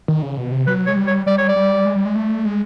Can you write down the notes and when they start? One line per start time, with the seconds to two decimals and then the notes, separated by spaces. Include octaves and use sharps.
0.08 D#3
0.22 C#3
0.37 B2
0.52 C3
0.67 F#3 B4
0.86 G#3 C#5
0.96 G3
1.07 C#5
1.26 G3 D5
1.38 C#5
1.49 D5
1.56 G3
1.85 G#3
1.95 G3
2.05 G#3
2.16 A3
2.45 G#3